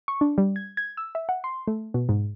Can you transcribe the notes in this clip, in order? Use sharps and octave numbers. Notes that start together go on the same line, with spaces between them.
C#6
D4
G3
G#6
G#6
E6
E5
F#5
C6
A3
B2
G#2